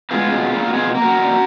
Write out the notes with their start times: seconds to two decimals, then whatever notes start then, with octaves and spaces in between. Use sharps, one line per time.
0.11 G#3 B3 F4 G#4
0.31 B2
0.53 A#3
0.68 F#4
0.73 B2 F4 G#4
0.94 A#3
1.02 F#4 A#4
1.16 A#2